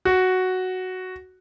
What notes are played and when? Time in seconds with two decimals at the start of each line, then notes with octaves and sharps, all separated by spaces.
0.05 F#4